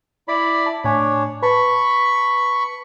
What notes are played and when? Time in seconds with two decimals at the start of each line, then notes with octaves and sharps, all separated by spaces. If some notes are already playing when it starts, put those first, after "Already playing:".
0.28 E4 D5 B5
0.66 A5
0.84 A2 D4 C#5 G#5
1.42 B4 A5 B5 C#6